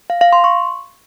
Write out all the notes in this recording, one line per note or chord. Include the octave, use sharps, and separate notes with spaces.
F5
F5
C6
C#6